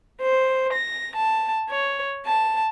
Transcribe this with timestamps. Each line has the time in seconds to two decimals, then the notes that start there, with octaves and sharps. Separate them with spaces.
0.22 C5
0.74 A#6
1.16 A5
1.71 C#5
2.26 A5